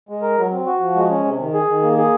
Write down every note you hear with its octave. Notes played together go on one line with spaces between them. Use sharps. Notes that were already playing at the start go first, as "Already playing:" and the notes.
G#3
A#4
F#3
C4
F#4
F3
G#3
C#4
C3
D#3
G#4
D#3
A#3
G#4